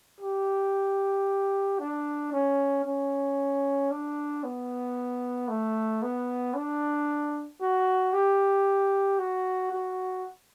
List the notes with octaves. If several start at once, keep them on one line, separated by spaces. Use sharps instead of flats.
G4
D4
C#4
C#4
D4
B3
A3
B3
D4
F#4
G4
F#4
F#4